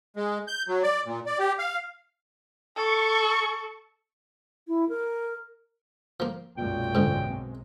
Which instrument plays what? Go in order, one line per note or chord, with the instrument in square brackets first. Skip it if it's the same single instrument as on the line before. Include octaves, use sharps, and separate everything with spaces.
[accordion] G#3
G6
F#3
D5
A#2
D5
G4
F5
[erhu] A4 [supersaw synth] C#6
[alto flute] E4
A#4
[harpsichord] F3 A#3
[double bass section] B1 F#2 G#3 [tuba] A#2 [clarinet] G5
[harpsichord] G#2 D3
[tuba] C4